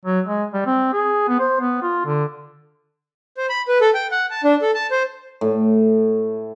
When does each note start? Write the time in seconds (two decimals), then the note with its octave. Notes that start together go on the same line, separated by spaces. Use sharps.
0.05 F#3
0.27 G#3
0.54 G3
0.66 C4
0.93 G#4
1.28 B3
1.39 C5
1.60 B3
1.82 F4
2.06 D3
3.37 C5
3.49 B5
3.68 B4
3.81 A4
3.94 G5
4.11 F#5
4.30 A5
4.44 D4
4.62 A4
4.74 A5
4.91 C5
5.41 A2